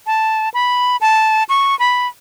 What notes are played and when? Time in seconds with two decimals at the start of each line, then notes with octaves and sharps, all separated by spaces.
0.07 A5
0.54 B5
1.01 A5
1.49 C#6
1.79 B5